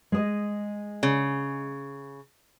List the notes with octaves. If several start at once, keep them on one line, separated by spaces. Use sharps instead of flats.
G#3 D#5
C#3